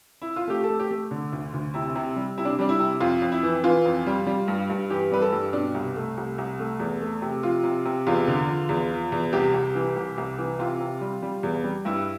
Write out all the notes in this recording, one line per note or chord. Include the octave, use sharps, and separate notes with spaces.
E4
F4
A3 G4
A4
A3
G4
A3
D3
D2
D2
C3 E4
C3
G3
C3 E4
D4
G3 D4
E4
C3
F2 F4
F2
E4
E3
E3 F4
F2
G3
G3
G2
G2
E3 G4
G3 B4
A4
G2
B2 D4
C2
A3
C2
C2
A3
E2
A3
C3
F3 F4
C3
C3
E2 F4
D3
F3
E2
F3
E2
C2 G4
C2
E3
C2
C2
E3
C3 F4
C3
G3
G3
E2
G3
G2 E4